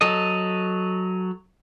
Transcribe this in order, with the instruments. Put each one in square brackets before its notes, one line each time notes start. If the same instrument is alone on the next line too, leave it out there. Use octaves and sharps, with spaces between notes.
[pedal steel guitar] F#3 A4 D#5